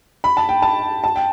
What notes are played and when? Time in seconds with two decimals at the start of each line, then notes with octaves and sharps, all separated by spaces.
0.24 B5
0.37 A5
0.49 G5
0.62 A5
1.04 A5
1.16 G5